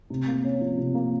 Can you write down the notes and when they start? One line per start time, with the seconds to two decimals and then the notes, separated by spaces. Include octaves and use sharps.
0.10 C3
0.27 A#3
0.44 C#4
0.61 F3
0.78 C3
0.95 A#3